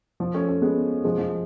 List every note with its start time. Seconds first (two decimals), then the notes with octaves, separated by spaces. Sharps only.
0.20 F3
0.34 A3 C#4
0.48 A3 C#4
0.62 G#3 B3
1.04 F3 G#3
1.18 F3